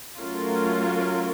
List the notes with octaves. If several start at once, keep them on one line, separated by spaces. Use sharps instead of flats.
F#3 A3 C#4 F4 A#4